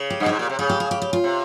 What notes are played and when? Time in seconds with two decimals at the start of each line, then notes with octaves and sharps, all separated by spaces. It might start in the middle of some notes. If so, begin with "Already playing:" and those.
Already playing: C#3
0.10 G4
0.20 G2
0.26 G#2 G4
0.39 A#2
0.49 C3
0.59 C#3 G#4
0.69 G4
0.80 G#4
0.91 G4
1.02 G4
1.13 F4
1.24 C3